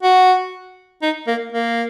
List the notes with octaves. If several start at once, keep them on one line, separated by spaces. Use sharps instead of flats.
F#4
D#4
A#3
A#3